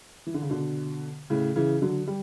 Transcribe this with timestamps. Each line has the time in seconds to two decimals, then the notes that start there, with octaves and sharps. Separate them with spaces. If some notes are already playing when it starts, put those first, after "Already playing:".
0.26 E3
0.34 D3
0.42 C#3
0.50 B2 D3
1.30 A2 C#3
1.56 C#3 E3
1.82 D3 F#3
2.07 G3